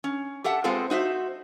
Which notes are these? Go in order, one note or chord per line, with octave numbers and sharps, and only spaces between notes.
C#4
G4 A4 E5 F#5 A5
G#3 B3 C4 F4 A4 C5
D#4 F#4 C5 E5